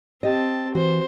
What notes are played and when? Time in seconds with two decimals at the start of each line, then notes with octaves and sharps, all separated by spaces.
0.23 C4 G4 D#5 A5
0.75 E3 F#4 C5